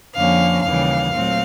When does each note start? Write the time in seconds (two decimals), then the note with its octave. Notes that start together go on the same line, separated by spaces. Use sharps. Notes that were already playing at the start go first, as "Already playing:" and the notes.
0.15 F2 D3 F3 A#3 C#4 F5
0.64 D#2 C#3 E3 G3 F5
1.12 A#2 F#3 A3 C4